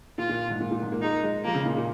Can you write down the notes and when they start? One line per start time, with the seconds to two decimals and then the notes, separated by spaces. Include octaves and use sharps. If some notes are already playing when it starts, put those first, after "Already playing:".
0.18 A#2 F4
0.29 A#2
0.50 G#2
0.60 A#2
0.71 A#2
0.82 G#2
0.92 A#3
1.02 G#3 D#4
1.23 G#3
1.45 F3 A#3
1.55 C#3
1.66 A#2
1.77 A#2